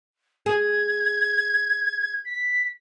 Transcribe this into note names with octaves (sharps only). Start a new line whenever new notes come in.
G#4 G#6
B6